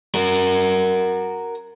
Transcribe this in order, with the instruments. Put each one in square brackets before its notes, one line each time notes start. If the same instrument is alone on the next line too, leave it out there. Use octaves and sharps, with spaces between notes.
[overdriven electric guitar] F#4 A#4